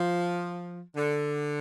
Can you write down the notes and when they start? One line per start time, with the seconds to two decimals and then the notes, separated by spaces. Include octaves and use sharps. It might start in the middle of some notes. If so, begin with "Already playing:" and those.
Already playing: F3
0.97 D3